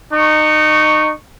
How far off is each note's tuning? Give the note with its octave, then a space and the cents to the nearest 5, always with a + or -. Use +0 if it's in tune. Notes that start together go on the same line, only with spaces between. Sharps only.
D#4 -25 C#6 +0